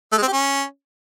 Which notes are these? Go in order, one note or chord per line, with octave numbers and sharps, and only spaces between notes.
A3
G#3
C4
G4
C#4